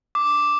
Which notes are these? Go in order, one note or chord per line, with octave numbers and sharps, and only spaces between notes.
D6